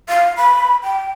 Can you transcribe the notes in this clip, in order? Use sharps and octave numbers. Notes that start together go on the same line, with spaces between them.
F5
B5
G5